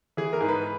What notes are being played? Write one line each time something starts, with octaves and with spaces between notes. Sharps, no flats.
E3 G#4
A#4
G#2
B4